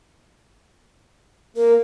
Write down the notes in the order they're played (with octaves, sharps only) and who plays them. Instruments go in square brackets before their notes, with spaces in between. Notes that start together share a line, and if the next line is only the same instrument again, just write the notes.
[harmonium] A#3 [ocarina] A#4